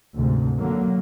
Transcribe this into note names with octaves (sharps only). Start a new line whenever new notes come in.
D2 G#2 C3
D3 F#3 A#3